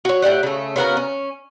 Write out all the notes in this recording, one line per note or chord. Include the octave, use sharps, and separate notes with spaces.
F#4 C#5
A2 G4 D5 F#5
C#3 A3
C#3 B3 F#4 A#4
C#4